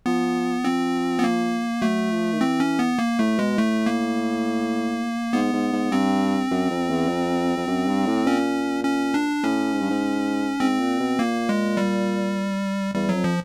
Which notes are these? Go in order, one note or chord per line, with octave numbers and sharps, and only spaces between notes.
F3 B3
F3 C4
B3
A#3
F#3 A3
F3
D#3
E3 C4
C#4
B3
A#3
A2 A3
B2 G#3
A2 A3
A#3
G#2 B3
G#2
G#2
G2 C4
F#2
F2
E2
F2
F2
F#2
G2
A2
A#2 C#4
C#4
D4
A2 C#4
G#2
G2
G#2
G#2 C4
A#2
B2
A#2 A#3
G#3
G3
E2 G3
F#3
F2
F3